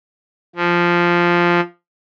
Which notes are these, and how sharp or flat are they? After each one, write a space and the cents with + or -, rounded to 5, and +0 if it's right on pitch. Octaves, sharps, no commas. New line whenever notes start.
F3 -5